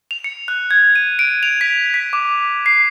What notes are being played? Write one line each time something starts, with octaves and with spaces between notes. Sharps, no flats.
F7
C#7
F#6
G#6
D#7
D7
F7
B6
B6
D6
C7